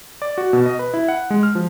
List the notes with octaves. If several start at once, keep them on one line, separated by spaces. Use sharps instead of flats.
D5
F#4
B2
D#5
B4
E4
F#5
G#3
F6
F3